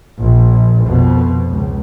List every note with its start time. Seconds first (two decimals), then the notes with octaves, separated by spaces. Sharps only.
0.20 A#1
0.86 F2 B2
1.49 C#2